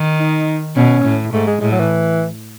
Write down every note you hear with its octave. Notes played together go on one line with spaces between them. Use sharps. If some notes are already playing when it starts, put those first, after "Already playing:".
Already playing: D#3
D#4
B2 C#4
A2
G#2 A3
G#3
A2 G#3
F#3
E3